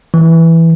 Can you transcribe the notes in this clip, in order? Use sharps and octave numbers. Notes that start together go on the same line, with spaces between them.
E3